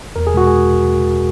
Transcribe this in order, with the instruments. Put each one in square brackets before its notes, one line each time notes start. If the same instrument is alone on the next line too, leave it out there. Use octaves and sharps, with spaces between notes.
[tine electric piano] E2 A#4
G#4
B2 G#3 F#4
G#4